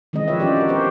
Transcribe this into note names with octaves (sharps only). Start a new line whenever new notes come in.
D#3 E3 G#3 C4 D#5
F3 F4 B4 C#5 E5
C#4 D4 F4 G4 D5
F#4 A#4
B3 G4 A#4 C5